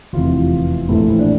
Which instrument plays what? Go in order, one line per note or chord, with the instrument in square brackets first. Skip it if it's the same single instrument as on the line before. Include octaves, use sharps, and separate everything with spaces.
[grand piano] F1 E2 C3 E3 F4
A#1 A2 E3 A3 E4
D4